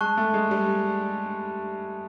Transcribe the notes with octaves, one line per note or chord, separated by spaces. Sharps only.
G#3 A5 C#6 F#6
A3
G#3
G3